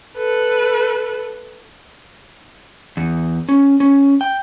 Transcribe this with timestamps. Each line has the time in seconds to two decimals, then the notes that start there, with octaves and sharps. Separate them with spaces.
0.17 A4 B4
2.97 E2
3.49 C#4
3.80 C#4
4.21 G5